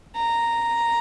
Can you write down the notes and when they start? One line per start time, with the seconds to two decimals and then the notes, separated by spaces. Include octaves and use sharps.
0.16 A#5